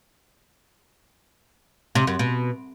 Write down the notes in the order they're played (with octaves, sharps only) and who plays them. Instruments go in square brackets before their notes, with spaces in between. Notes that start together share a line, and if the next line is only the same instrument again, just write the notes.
[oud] C3
F#2
B2